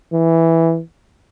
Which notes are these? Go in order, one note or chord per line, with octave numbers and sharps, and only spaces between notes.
E3